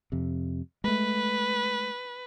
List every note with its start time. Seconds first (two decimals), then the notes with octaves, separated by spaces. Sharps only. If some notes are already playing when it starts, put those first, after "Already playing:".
0.12 F2 C3
0.84 G#3 A3 B4